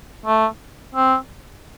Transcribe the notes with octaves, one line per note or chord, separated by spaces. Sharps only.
A3
C4